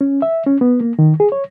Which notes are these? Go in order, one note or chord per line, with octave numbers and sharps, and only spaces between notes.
C#4
E5
C#4
B3
A#3
D#3
G#4
C#5